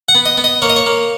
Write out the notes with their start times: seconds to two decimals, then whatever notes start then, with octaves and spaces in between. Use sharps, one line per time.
0.09 F#5
0.15 B3
0.26 D#5
0.37 B3
0.44 D#5
0.62 A#3 C#5
0.70 D#5
0.76 C#5
0.86 A#3